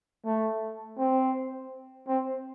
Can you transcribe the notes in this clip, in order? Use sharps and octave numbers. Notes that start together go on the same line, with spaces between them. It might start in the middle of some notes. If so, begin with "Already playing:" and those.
A3
C4
C4